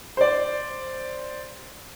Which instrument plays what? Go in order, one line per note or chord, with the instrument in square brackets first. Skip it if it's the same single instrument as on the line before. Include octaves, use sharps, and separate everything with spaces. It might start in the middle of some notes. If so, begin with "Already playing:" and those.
[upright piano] C5 D5